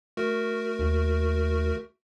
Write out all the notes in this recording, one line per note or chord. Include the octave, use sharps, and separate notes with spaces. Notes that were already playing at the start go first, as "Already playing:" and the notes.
A3 F#4 A#4
D#2